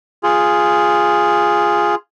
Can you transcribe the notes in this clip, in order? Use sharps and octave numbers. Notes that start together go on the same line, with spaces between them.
F4 G#4